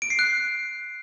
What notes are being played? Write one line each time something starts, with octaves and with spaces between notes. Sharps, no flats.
D7
C7
F#6